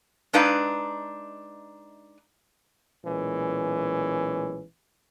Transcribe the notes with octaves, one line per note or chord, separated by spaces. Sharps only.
G#3 D4 D#4 B4 F5
B1 A#2 E3 G#3 C#4